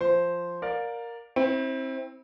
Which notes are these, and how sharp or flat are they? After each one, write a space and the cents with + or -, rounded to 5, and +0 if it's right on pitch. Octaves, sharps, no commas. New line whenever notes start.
F3 -5 C5 +0
A#4 +0 D5 +0 F5 +30
C4 +20 E4 -25